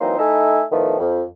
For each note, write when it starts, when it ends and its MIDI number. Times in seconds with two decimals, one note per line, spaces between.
0.01 0.16 52
0.01 0.16 54
0.01 0.16 58
0.01 0.16 60
0.01 0.16 63
0.01 0.16 72
0.19 0.63 57
0.19 0.63 63
0.19 0.63 64
0.19 0.63 69
0.19 0.63 76
0.19 0.63 80
0.72 0.97 45
0.72 0.97 51
0.72 0.97 53
0.72 0.97 57
0.72 0.97 59
0.99 1.23 41